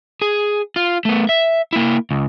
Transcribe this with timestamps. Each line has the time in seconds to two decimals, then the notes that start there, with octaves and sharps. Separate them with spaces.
0.22 G#4
0.76 F4
1.05 A3 B3
1.29 E5
1.73 A#3 E4
2.11 C#2